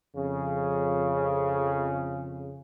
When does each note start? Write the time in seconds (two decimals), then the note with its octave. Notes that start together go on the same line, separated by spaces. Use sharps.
0.15 F2 C#3